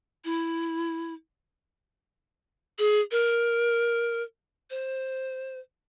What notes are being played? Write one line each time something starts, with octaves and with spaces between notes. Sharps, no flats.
E4
G#4
A#4
C5